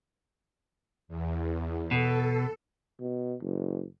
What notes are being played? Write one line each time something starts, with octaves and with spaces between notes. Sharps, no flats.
E2
B2 A4
B2
F#1